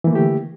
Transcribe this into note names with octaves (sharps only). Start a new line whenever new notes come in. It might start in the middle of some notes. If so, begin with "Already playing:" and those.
D3 E3 A3 A#3 G4